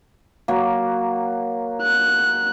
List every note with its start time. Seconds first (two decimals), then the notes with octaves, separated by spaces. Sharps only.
0.48 F#3 A#3
1.83 F#6